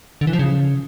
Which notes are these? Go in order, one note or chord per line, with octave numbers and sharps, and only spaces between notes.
D3
E3
F3
C#3